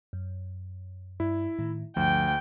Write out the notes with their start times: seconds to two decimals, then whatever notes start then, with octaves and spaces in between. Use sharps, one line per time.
0.13 F#2
1.20 G2 E4
1.59 A2 D#3
1.96 D2 G2 F3 G5